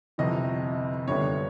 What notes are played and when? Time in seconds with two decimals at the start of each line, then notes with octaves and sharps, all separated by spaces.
0.18 G1 F2 C3 E3 D#5
1.07 G1 F#2 D3 G3 B3 C#5